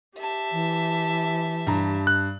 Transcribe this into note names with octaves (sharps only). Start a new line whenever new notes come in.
G4 E5 A5
E3
G2 A#5
F#6